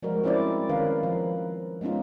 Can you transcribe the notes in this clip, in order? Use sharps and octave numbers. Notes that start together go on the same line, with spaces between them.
F3 G3 G#3 F#4 A#4
C4 C#4 E4 C5 D5
D#3 C#4 A#4 B4 F5
F3
G#3 B3 C#4 D#4 F4